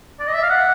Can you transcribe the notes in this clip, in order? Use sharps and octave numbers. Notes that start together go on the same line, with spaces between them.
D5
D#5
E5
F5
F#5